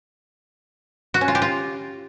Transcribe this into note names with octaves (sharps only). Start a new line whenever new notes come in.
F#4
C#4
F4
G4
F4